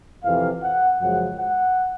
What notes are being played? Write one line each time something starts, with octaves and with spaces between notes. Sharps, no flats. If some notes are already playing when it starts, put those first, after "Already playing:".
F2 C3 E3 F5
F#5
F#2 C#3 F3 G#3 F#5
F#5